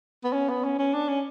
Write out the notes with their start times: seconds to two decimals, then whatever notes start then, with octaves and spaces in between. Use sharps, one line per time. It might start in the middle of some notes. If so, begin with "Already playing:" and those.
0.24 B3
0.33 C#4
0.49 B3
0.64 C#4
0.79 C#4
0.94 D4
1.09 C#4